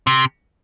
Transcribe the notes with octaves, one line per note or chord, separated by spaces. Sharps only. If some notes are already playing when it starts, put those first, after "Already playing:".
C3